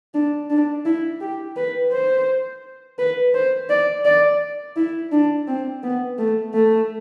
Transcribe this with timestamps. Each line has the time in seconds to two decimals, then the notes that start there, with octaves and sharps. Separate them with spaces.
0.14 D4
0.50 D4
0.85 E4
1.21 G4
1.57 B4
1.92 C5
2.99 B4
3.34 C5
3.70 D5
4.05 D5
4.76 E4
5.12 D4
5.48 C4
5.83 B3
6.18 A3
6.54 A3